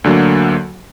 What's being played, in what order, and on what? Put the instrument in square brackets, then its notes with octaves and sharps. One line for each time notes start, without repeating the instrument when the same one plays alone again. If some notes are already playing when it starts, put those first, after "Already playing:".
[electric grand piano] D2 D3 F#3 A#3